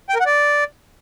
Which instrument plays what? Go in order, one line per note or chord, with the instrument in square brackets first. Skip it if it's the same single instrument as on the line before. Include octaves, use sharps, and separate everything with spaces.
[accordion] G5
A#4
F#5
D5